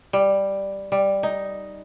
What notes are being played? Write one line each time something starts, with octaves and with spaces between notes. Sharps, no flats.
G3
G3
D#4